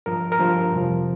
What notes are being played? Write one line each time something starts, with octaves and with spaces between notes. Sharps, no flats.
G2 F3 A#4
A#4
G2 F3 C5
F2 C3 F3